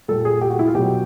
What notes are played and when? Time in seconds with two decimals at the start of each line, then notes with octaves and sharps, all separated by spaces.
0.08 A#2 G3 A4
0.25 G#4
0.41 G4
0.50 F#4
0.59 E4
0.67 F4
0.75 B2 F#3 G4